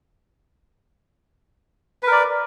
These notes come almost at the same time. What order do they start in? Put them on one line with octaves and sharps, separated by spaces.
B4 A#4 D5